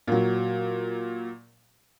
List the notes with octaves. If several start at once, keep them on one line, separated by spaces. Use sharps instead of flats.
A#2 F#3